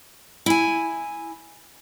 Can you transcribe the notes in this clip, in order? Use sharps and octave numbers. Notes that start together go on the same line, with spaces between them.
E4 G#5